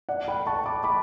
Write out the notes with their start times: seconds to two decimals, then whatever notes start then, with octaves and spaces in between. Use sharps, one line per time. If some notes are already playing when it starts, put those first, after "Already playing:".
0.09 D5 F#5
0.28 G5 B5
0.47 A5 C#6
0.66 B5 D6
0.84 B5 D6